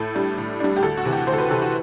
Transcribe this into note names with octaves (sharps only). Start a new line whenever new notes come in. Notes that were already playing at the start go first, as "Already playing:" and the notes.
Already playing: A2 A4
G3 D4
A2
G3 D4
G4
D2 A4
F#4
C3 E3
G4
D2 C5
A4
B4
C3 E3 A4
F#4